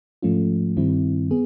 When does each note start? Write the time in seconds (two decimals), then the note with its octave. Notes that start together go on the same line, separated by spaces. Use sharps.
0.22 G#2 F3 A3 C#4 F4
0.77 G2 D#3 G3 C4 E4
1.31 B3 G#4